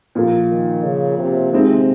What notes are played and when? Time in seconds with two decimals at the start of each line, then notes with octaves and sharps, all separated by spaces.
0.15 A#2 F3 A#3
0.49 D#3
0.83 C#3
1.19 C3
1.53 C3 D#3 G#3 C4